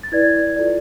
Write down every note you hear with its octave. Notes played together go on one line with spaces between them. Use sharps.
A6
E4 B4 D5 G#6
F4 A4 D5